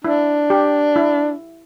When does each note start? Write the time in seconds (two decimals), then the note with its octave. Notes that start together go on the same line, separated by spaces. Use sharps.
0.04 D4 E4
0.50 G4
0.96 E4